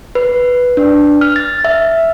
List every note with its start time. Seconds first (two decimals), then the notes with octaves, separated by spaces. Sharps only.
0.15 B4
0.77 D4
1.21 F6
1.36 A6
1.65 E5